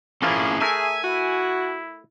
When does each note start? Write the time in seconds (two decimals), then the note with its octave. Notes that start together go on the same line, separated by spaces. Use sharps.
0.22 F3 A#3 C#4 E4 F4 G#4
0.61 A3 A#4 E5 G#5
1.03 E4 F#4